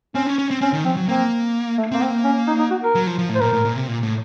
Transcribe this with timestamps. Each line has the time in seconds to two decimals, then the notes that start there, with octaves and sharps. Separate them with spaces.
0.15 C4 C#4
0.27 C#4
0.38 C#4
0.51 C4
0.61 C4 C#4
0.73 D#3
0.84 F3 C4
0.97 F#3
1.08 A#3 C4
1.78 A3
1.92 A#3 C4
2.02 A#3 C4
2.24 C#4
2.48 D#4
2.59 D#4
2.71 F#4
2.83 A#4
2.95 F#3
3.07 F3
3.18 F3
3.29 A2
3.35 C5
3.41 A#2 A#4
3.53 A2
3.65 A#2
3.76 C3
3.87 A#2
4.03 A2